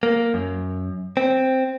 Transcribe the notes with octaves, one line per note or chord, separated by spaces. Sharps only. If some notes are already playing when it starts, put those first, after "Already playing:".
A#3
F#2
C4